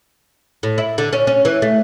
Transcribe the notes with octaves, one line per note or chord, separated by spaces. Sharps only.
A2
E4
D3
C#4
C#4
E3
A3